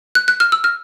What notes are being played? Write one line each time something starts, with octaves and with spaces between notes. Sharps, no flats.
F#6
F#6
F6
E6
F6